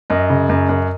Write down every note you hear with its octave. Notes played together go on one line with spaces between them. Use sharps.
F#2 D#5
C#3
F#2
F#2